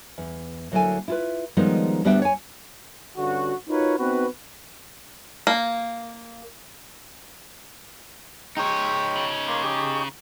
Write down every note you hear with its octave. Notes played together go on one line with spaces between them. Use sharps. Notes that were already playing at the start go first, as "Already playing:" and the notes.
E2
D2 F#3 A#3 E4 A4 G#5
E4 F4 B4
D#3 F3 G3 G#3 B3 D#4
D2 G3 B3 D4 E5 G5
C#5 G#5
G2 D3 C#4 F#4
D#4 F4 F#4 A#4 B4 C#5
B3 C4 D#4 F#4 B4
A#3
G#3 D#4 C#5 G5
C#3
A#3 C6 D6
G4 G#4 D6